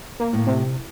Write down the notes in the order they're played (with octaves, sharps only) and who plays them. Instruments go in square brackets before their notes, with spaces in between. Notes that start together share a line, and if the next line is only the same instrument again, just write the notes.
[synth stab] A#3
[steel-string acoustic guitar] A2
[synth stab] C3